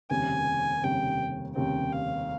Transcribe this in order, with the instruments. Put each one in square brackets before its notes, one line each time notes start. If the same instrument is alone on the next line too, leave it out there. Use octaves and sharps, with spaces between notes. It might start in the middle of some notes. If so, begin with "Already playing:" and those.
[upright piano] F1 D#2 C#3 G3 C4 [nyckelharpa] G#5
[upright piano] F1 D#2 C#3 G3 C4 [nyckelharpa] G5
[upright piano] F1 D#2 C#3 G3 C4 [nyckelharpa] G5
[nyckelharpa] F5